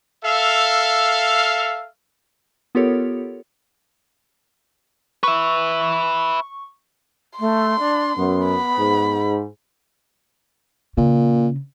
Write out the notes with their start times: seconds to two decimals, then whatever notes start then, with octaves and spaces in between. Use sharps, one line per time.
0.24 A4 E5 F5
2.75 B3 F4 G4 A4 A#4 C#5
5.23 B4 E5 C#6
7.39 A3 C6
7.79 D4
8.16 F#2 B3
8.46 B5
8.78 G#2
10.97 A#2 C#3